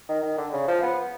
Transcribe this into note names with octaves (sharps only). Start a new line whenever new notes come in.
D#3
D#3
D3
C#3
F3
B3